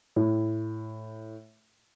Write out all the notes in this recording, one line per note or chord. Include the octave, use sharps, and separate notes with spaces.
A2